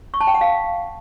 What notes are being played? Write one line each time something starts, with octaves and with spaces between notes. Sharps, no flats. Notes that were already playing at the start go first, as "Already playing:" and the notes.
C#6
A5
G5
F#5
F5